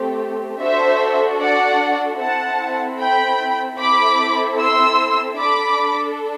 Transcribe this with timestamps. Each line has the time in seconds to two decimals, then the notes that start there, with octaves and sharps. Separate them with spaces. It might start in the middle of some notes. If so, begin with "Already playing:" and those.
Already playing: A3 C4 G4
0.61 D4 F#4 A4 C5 E5
1.41 D5 F#5
2.21 C4 E4 A4 F#5 A5
3.00 G5 B5
3.79 C4 E4 A4 B5 D6
4.59 C6 E6
5.38 D4 A4 B5 D6